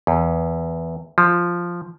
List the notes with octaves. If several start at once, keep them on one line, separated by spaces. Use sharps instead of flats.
E2
F3